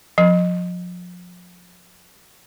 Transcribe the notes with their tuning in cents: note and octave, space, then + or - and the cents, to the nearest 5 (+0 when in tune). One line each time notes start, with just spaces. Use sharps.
F3 +35